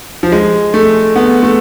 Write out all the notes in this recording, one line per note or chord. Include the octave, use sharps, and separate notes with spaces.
F3
G#3
A3
B3
A3